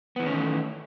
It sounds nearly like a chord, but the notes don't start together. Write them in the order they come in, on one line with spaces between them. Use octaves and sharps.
B3 E3 D#3 C#4 A3